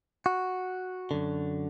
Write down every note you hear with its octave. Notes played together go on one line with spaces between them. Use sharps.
F#4
F#2 D3